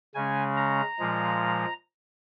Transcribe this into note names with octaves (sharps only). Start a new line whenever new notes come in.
C#3 G#3 C#4 G#5
A#5
A#2 F3 G#3